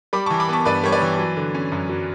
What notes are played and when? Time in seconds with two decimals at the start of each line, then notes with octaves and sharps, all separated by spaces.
0.13 G3 B5 D6
0.26 E3 A5 C#6
0.40 B5 D6
0.49 B3 A5 C#6
0.65 G2 B4 D5
0.84 G3 C#5
0.92 B4 D5
1.01 E3
1.19 F#3
1.37 D3
1.54 C#4
1.72 F#2
1.89 F#3